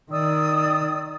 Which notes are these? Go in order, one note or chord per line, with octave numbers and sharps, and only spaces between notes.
D#3 D5 D#6 E6